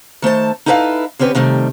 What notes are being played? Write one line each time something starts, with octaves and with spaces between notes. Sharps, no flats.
D#3 A3 C5 A5
D#4 E4 A4 B4 D5 F5
D3 C4 C#4 G4 B4
C3 D#3 G3 A3